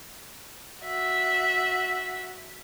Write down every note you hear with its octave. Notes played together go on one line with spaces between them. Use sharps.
F#4 E5